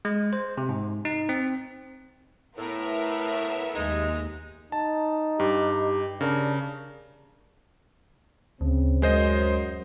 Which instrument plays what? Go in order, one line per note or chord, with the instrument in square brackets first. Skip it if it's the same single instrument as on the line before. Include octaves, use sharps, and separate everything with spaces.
[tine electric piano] G#3
C5
C3
G#2
D#4
C4
[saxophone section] A2 [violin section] B3 A#4 E5
[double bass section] D#2 [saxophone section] G#3 D#4
[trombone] D#4 [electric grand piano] A5
[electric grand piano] G2 [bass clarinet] G4
[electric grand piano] C#3 A#4 [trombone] D4
[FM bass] D2 [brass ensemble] C#3 C4
[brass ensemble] F#2 [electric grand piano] G#3 C5 D#5